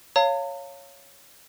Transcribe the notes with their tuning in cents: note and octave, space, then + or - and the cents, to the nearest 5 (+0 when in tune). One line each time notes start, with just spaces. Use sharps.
C#5 +0 F5 -10 A#5 -45